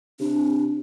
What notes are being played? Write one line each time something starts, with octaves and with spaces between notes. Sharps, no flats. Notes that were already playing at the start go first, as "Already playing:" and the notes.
C3 D4